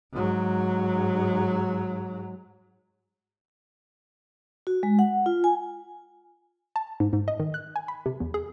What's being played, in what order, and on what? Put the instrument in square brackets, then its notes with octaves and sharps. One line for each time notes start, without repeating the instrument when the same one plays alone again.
[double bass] G#2 F#3
[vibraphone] F#4
G#3
F#5
F4
G#5
[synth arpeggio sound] A5
G#2
G#2
D#5
D#3
F#6
G#5
B5
C3
E2
G#4